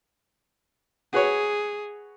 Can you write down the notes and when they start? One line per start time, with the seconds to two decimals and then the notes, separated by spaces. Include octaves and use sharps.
1.13 F#4 G#4 B4 C#5